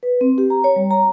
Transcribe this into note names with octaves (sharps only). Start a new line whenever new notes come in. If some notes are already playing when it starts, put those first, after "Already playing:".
B4
C4
G4
A#5
C#5
G3
A#5